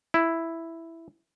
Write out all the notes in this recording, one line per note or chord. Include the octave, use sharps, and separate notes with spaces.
E4